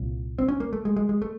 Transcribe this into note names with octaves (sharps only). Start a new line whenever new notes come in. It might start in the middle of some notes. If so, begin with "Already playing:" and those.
Already playing: C2 A#2
C4
C#4
A#3
A3
G#3
G#3
G#3
A3